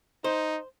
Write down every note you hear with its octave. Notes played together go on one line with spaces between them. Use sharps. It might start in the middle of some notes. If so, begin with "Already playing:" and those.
D#4 C5